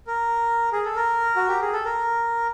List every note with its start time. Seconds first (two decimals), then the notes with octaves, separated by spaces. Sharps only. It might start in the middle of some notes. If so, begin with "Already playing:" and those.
0.07 A#4
0.73 G#4
0.85 A4
0.96 A#4
1.36 F#4
1.48 G4
1.61 G#4
1.73 A4
1.85 A#4